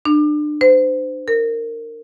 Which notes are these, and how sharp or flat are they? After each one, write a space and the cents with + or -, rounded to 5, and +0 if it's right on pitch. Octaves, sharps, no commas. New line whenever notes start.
D4 +30
C5 -30
A#4 -20